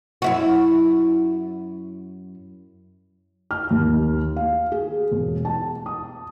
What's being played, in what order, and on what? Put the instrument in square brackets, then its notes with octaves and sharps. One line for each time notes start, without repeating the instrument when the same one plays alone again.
[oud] F#2 E4 F#4
[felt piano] F6
D#2
F5
G#4
E1
A5
D#6